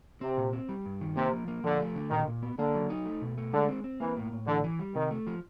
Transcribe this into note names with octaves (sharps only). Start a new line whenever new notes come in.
C3 C4
A#2
C4
G3
G2
D#3
C3 A#3
F3
A#3
D3 F3
A3
D3
A#2 D#3
A#2
B3
D3 A#3
F#3
D#4
A3
B2
A3
D3 G#3
C4
C4
E3 A#3
A2
A2
D3 E3
E3
G3
C3 D#3
A3
F3